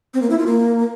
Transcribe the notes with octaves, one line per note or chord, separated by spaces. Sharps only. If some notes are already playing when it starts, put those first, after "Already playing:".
C4
A#3
E4
F4
A#3